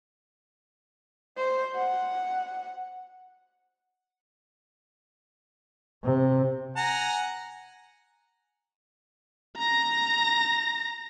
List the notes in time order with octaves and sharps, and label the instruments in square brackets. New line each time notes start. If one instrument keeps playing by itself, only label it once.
[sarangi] C5
F#5
[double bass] C3
[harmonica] F#5 G#5 A#5
[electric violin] A#5 A#6